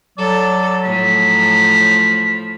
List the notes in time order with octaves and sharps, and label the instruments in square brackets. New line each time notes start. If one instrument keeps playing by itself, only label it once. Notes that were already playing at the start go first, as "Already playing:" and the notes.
[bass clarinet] F#3 [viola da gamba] A4 [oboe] D5
[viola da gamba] A2 F3 [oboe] B5